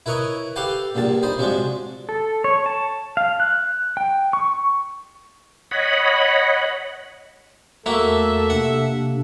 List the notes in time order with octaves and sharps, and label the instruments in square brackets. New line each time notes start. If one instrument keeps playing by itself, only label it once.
[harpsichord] E4 A#4 B4 C#5 D#5
G4 A4 B4 F5 G5 A5
A#1 G2 A#2 A5
D#4 C5 B5
C3 F3 F#3 G#3 D4
[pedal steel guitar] A4
C#5
A5
F5
F#6
G5
C#6
[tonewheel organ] C#5 D#5 F#5 B5
[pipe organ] E2 A3 [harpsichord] A#3 F#4 [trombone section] A4 [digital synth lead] E5
[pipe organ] C3 A#3 D4 [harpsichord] F#5